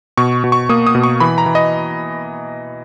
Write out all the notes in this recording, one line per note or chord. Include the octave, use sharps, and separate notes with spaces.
B2 C#6
B2
C#6
A#3 D#6
D#6
B2
C#6
E3 B5
A#5
E3
D#5